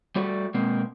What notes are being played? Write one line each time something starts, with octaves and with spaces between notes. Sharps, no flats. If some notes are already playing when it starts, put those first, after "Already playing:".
G3 A3 F#4 D5
B2 G#3 A#3 C4